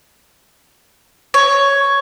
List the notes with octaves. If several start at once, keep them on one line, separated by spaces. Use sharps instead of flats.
C#5